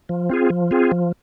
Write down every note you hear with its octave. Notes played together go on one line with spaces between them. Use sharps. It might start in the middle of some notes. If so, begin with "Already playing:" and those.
F3
C4 F4 G#4
F3
C4 F4 G#4
F3